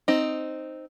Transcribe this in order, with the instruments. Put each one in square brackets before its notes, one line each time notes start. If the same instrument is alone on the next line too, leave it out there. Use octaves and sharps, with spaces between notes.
[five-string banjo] C4 D#4